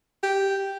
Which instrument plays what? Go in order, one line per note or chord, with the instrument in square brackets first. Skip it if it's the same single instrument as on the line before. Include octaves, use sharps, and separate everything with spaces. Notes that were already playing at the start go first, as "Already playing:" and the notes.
[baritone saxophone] G4